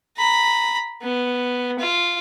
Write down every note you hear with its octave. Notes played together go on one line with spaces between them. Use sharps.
A#5 B5
B3
F4